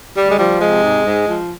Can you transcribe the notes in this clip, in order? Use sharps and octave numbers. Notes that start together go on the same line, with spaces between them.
D2 G3
G#3
F3 G3
C3 G#3
G#2
G#2
F3